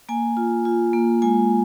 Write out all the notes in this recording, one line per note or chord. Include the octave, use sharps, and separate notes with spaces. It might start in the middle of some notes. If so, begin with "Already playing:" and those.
A#3 G#5
F4
F4
A#3
G#3 G#5